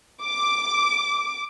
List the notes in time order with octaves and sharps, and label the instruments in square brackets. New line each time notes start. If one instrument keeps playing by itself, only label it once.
[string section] D6